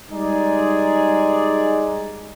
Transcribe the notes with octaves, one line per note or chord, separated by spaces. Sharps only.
G3 G#3 D#4 G#4 D5